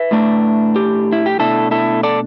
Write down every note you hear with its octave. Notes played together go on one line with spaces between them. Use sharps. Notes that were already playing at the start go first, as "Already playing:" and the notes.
Already playing: B4 E5
A2 A3 D4
G4
E4
G4
B2 A3 D4 E4 A4
E4 A4
A4 D5